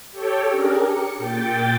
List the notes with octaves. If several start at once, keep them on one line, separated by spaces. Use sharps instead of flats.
G4 A4 C#5 G5
C#4 D4 G4 G#4 A#4
C#7
A#2 G5 A6